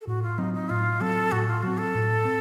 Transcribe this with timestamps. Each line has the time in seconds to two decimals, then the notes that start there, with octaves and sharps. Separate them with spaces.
0.01 A4
0.07 A2 F#4
0.23 F4
0.38 F#3 C4 D#4
0.54 D#4
0.70 A2 F4
1.01 F#3 C4 A4
1.32 A2 F#4
1.47 F4
1.63 F#3 C4 F#4
1.78 A4
1.95 A2
2.25 C4